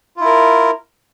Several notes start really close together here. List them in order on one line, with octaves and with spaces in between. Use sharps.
F4 E4 A#4